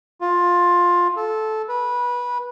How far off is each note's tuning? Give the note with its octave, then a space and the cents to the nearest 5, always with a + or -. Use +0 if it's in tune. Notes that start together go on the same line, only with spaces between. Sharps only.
F4 +15
A4 -15
B4 -20